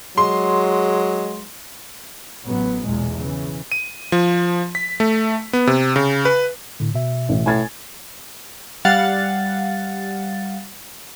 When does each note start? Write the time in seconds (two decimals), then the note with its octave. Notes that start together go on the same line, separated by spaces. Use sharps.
0.18 F#3 G#3 C6
2.45 A1 F#3 B3
2.86 B1 E2 A#2 G#3
3.19 C#3 E3
3.72 D#7
4.12 F3
4.75 B6
5.00 A3
5.53 B3
5.67 C3
5.96 C#3
6.25 B4
6.80 A2 D3
6.95 B2 E5
7.29 A1
7.46 A2 G#5 G#6 A6
8.85 G3 F5 F#5 A6